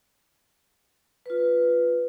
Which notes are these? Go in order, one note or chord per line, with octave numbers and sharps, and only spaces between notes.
F4 B4